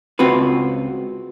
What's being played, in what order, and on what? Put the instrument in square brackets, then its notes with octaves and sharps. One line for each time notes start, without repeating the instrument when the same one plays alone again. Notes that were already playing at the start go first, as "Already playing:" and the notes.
[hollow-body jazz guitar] C#2 C4 F4 F#4 B4